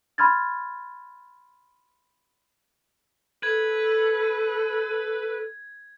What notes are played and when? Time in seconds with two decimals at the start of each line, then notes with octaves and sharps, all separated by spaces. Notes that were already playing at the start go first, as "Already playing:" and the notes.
0.18 B5 C6 F6 G#6 A6
3.43 A4 B4 G#6